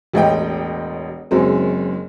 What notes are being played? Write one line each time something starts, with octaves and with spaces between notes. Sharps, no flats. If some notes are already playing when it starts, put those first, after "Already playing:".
E1 A1 D#5 G5
F#1 F#2 G#3 C4